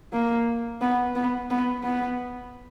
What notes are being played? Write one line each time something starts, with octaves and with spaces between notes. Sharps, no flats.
A#3
B3
B3
B3
B3